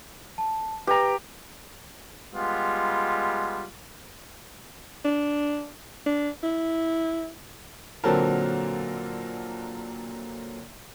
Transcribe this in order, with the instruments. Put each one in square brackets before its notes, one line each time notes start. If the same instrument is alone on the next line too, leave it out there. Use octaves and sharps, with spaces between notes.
[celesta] A5
[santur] G4 A#5 [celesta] B4
[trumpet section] G3 G#3 B3 F4
[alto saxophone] D4
D4
E4
[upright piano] A#2 D3 F#3 C4 A4 A#4